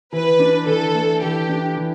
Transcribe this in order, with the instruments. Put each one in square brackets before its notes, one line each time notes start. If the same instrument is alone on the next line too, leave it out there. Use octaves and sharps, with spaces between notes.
[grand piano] E3 [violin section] B4
[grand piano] D4
[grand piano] E3 [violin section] A4
[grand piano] A3
[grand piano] E3 [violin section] G4
[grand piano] D4
E3